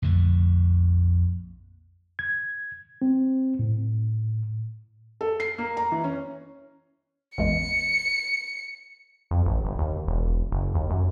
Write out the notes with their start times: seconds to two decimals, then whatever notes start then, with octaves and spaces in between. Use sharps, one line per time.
0.02 A#1 F2 D3 A3
2.19 G#6
3.02 C4
3.59 A2
5.21 A4
5.40 C7
5.58 A#3
5.77 A#5
5.92 E3
6.04 C#4
7.38 A1 E2 G#3 C#7
9.31 F2
9.46 A1
9.65 G1
9.79 D#2
10.08 E1
10.52 F#1
10.74 D#2
10.90 F#2